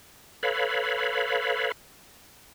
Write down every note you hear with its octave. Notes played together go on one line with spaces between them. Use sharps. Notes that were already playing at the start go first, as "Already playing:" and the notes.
A4 B4 C#5 F5 B5